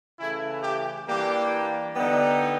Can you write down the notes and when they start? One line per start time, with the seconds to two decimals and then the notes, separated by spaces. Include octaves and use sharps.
0.19 C#3 E3 A3 E4
0.63 G4
1.08 E3 G3 A#3 D4 G4
1.96 D3 G3 B3 D#4